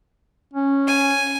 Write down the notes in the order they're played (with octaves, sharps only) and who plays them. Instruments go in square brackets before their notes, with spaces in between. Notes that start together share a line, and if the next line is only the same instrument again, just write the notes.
[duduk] C#4
[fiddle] G#5